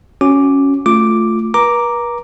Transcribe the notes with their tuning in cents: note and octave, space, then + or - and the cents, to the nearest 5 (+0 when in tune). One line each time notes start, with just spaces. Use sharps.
C#4 +0 F#4 +0 D6 +0
A3 +0 F4 +0 D6 +0
B4 -45 A#5 +0 D6 +0